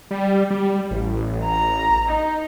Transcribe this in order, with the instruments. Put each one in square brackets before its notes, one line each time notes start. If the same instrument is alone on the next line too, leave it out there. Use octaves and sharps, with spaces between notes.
[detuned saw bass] G3
G3
A1
[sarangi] A#5
D#4